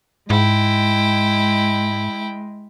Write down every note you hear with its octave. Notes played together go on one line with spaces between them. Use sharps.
G#2 G#3 E4 G5